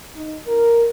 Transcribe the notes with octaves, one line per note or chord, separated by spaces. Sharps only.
D#4
A#4